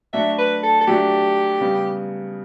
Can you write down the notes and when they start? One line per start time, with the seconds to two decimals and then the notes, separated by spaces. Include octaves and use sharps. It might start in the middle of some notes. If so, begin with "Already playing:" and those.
0.13 F#3 A3 D4 F#4 E5
0.38 B4
0.63 A4
0.81 A4
0.87 F#3 A3 D4 F#4 G4
1.61 C#3 G3 B3